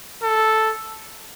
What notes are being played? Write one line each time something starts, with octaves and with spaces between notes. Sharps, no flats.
A4